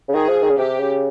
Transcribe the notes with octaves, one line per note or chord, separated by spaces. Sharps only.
C#3
D#3 G#4
F3
D#3
C#3
C3 G4
C#3